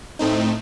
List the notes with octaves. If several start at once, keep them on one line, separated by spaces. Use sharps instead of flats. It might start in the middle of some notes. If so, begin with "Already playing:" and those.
A2 A3 C4 D#4